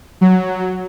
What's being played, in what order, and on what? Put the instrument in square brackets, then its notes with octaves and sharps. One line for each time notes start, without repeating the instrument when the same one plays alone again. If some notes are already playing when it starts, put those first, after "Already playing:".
[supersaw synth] F#3